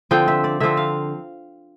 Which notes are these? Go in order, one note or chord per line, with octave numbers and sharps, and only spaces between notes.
D3 F3 C4 G5
E5
D5
D3 F3 C4 E5
F5